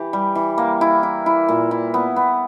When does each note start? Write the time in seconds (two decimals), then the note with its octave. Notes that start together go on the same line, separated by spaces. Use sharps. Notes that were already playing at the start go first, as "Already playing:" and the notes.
Already playing: E3 G4
0.13 G3
0.35 E3
0.58 A#3
0.81 E4
1.03 E4
1.26 E4
1.49 A#2
1.71 E4
1.94 B3
2.16 B3